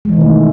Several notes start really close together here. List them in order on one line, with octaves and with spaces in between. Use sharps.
G#3 E3 D#3 B2 A3